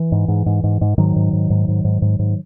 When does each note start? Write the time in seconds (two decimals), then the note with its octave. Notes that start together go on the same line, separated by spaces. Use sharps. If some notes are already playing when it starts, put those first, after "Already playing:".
Already playing: E3
0.12 G#2
0.28 G#2
0.46 G#2
0.64 G#2
0.81 G#2
0.98 G#2 D#3 F#3
1.16 G#2
1.33 G#2
1.50 G#2
1.68 G#2
1.85 G#2
2.02 G#2
2.19 G#2